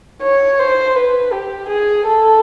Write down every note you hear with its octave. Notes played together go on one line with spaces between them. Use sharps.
C#5
C5
B4
G4
G#4
A4